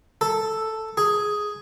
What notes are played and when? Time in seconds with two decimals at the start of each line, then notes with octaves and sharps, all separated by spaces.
0.21 A4
0.97 G#4